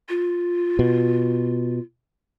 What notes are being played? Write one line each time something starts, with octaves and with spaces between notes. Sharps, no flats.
F4
B2